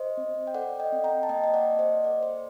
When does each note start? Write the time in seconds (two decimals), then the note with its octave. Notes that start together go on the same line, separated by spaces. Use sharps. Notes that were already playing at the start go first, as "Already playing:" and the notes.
Already playing: C5 D#5
0.17 C4
0.47 G5
0.54 A4 D5 F#5
0.80 D#5 G5
0.92 C4
1.04 G5 A#5
1.23 A5
1.29 A#3 D#5 G5
1.44 D#5
1.54 D5 F#5
1.67 A#3
1.79 C5 D#5
2.04 A4 D5
2.23 C5